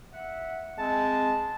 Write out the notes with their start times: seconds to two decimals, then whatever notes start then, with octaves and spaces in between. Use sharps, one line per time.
0.13 E5 F#5
0.79 G#3 C4 A5